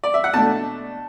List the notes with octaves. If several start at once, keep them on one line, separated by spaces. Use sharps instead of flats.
D5
E5
F#5
B2 A3 D4 A5